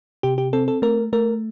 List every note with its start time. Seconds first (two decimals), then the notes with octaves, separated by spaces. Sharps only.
0.23 C3 G4
0.38 G4
0.53 C4 A4
0.68 A4
0.82 A3 A#4
1.13 A3 A#4